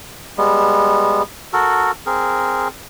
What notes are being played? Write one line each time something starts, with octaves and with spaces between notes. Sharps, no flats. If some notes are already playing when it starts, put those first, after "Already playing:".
G3 G#3 B3
F#4 A4 A#4
C4 G#4 A#4